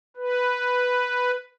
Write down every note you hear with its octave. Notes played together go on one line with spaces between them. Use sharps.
B4